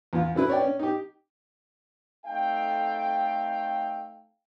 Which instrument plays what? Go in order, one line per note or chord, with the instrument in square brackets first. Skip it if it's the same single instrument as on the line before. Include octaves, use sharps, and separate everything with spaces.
[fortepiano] E2 F4
C#3 F#3 E4 B4
C#5 D5 G5
C#4
D#4 G4
[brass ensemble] A3 C4 D#4 A4 F5 G5